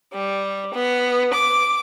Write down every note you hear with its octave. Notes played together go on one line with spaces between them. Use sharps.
G3
B3
D6